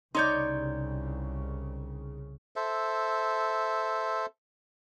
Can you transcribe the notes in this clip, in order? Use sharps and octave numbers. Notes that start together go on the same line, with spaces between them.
C2 C#3 D#4 C#5 D5 C6 G6
A4 C5 E5